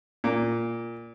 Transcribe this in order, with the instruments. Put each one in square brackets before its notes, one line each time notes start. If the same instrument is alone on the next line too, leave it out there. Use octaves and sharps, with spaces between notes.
[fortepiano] A#2